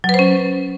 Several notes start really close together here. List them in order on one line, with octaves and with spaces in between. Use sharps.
F#3 B4 C5 C#4